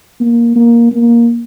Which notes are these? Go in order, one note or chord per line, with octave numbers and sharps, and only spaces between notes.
A#3
A#3
A#3